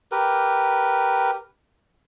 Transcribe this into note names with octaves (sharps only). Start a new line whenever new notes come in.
G4 A#4 B4